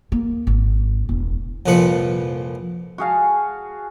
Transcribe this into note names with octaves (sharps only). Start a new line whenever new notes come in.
A#3
G#1
E1
C2 F2 A#2 F3 B4 F#5
F#4 G#4 F5 A5